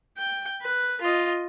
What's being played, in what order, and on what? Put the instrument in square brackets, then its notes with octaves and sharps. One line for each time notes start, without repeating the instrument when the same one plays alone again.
[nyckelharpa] G5
B4
F4 D#5